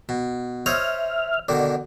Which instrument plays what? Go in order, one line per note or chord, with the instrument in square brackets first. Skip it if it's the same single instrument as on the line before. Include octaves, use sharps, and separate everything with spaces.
[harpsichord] B2
[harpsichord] C5 C#5 D#5 [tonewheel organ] E5 F6
[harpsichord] B2 D3 D#3 [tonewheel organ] D5